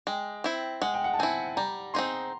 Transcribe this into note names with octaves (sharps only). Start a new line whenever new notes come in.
G#3 G5
C4 E4
G#3 F#5
G5
F#5
A5
C4 E4 G#5
G3 A#5
C4 D#4 G#4 C6